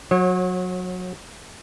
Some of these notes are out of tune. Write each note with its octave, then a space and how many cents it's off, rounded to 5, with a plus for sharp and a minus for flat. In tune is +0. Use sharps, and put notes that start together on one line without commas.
F#3 -20 C#5 -35